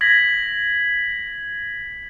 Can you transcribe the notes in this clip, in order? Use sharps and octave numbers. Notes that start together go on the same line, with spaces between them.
G#6 A#6 B6 F#7